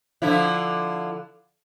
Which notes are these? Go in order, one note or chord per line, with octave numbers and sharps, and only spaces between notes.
D3 F3 E4